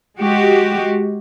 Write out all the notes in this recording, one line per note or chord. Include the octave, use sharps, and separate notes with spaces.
G#3 F#4 G4